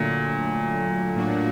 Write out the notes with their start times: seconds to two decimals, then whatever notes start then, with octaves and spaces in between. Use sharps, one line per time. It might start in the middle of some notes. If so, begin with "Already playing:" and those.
Already playing: A#2 D3 F#3 A3
1.15 A2 F#3 A#3 D4 F#4